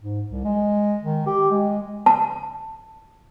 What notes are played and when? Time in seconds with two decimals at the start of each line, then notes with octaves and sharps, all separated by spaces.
0.01 G#2
0.30 C2
0.45 G#3
1.03 D#3
1.27 G4
1.51 G#3
2.06 A5